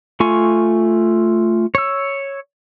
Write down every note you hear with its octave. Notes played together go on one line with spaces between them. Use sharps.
A3 F4 G#5 C#6
C#5 E6